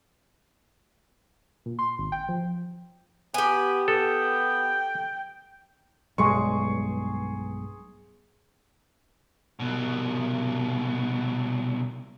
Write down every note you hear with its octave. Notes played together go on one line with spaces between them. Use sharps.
A#2
C6
G#1
G5
F3
B3 G4 G#5
B3 A4 G5
B1 G2 G#3 G#4 C6 C#6
C2 B2